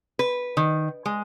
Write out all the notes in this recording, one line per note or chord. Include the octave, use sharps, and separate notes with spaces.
B4
D#3
G#3